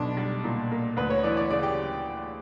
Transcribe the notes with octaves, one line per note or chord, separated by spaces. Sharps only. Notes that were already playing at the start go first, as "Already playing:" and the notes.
Already playing: B1 D4
G3
A#2
A#3
D2 B4
C#5
E3 D5
D5
C#3 D5
G4